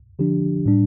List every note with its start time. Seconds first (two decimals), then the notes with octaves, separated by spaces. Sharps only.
0.19 D3 F3 D4 G4
0.66 A2 G3 D4